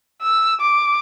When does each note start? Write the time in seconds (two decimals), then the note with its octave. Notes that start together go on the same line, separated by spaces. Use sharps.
0.22 E6
0.61 D6